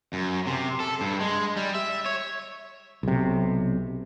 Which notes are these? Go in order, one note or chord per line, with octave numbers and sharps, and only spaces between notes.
F#2
C3
A4
G2
G#3
G3
E5
C#5
B1 C3